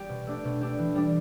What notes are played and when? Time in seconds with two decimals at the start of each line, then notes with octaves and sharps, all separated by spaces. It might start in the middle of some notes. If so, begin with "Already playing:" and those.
Already playing: G3 G4
0.09 B2
0.27 A3 D4 G4
0.44 B2
0.61 A3 D4 G4
0.79 E3
0.95 G3 D4